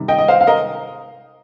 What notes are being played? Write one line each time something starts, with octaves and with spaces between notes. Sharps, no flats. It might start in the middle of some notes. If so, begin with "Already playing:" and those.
Already playing: C3 D#3 G3
D#5 G5
D#5
C5 F5
F5
A#4 D#5